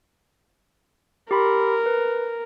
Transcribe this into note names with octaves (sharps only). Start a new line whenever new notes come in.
G4 A#4 B5 C6
B4